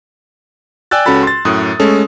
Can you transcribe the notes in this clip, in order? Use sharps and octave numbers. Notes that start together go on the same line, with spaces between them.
D5 G5 G#5 E6 F#6 A6
C#2 C#4 F#4 A4 B5 A6
C6 A6
F#2 A2 D#6 F#6
G#3 A3 C#4 A4